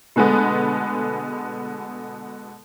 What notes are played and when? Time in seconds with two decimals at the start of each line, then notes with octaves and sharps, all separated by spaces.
0.16 B2 D3 G#3 A3 B3